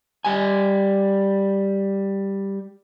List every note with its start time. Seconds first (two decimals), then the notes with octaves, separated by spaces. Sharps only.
0.25 G3 G#5